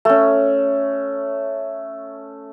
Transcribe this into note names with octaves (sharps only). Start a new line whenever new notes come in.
A3 C#4